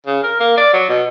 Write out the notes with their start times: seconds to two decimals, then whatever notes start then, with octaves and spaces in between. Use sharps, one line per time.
0.06 C#3
0.23 A#4
0.40 A#3
0.58 D5
0.73 F#3
0.89 B2